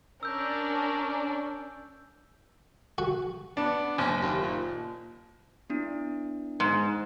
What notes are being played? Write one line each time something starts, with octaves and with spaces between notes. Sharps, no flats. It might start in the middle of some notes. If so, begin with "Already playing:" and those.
C#4 D4 A#4 D5 E6 G6
F#4
B3 D4
F#1 C#4
D#2
A#2
B3 D4 E4
G#2